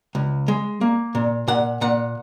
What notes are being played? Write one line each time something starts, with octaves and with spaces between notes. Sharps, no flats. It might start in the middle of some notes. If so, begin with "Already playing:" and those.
C#2
G#3
A#3
A#2
A#2 F#5
A#2 F#5